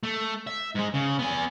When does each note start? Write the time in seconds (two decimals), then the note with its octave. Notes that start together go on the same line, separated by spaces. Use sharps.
0.03 A3
0.47 E5
0.75 G#2 G#3
0.94 C#3
1.19 B3 G#5